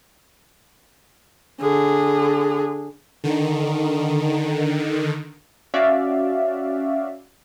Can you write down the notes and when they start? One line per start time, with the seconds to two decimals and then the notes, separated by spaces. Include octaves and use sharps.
1.61 D3 G#4
3.24 D3 D#3
5.74 C#4 F#4 D5 E5 F5